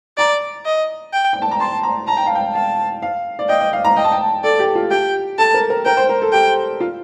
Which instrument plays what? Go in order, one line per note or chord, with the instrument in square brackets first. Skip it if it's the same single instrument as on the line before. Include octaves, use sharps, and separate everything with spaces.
[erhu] D5 [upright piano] A#5
[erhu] D#5
G5
[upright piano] G5
A5
A#5
[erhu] A5 [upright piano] C6
[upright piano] A#5
[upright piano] A5 [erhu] A#5
[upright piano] G5
F5
G5
[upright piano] F5 [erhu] A5
[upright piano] F5
D5
[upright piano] D#5 [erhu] G5
[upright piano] D#5
F5
A#5
[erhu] D#5 [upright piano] G5
[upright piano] A5
G5
[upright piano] A4 [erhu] D5
[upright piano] G4
F4
[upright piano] G4 [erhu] G5
[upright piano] A4 [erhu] A5
[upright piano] A#4
A#4
[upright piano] A#4 [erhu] G5
[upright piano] C5
A#4
A4
[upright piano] G4 [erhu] G5
[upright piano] F4